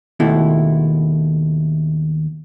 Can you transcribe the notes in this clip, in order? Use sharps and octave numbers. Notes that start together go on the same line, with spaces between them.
D#2 B2 A3 E4